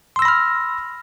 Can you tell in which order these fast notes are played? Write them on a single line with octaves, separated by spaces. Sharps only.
C6 E6 A#6 B5 F6